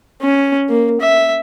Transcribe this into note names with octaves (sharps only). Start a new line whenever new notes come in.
C#4
A#3
E5